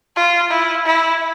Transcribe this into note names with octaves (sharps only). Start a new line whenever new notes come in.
F4
E4
E4